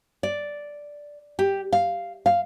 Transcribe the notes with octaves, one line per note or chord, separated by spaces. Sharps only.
D5
G4
F5
F5